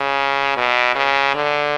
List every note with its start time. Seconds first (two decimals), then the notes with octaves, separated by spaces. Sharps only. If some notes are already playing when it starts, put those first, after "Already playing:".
Already playing: C#3
0.57 B2
0.95 C#3
1.35 D3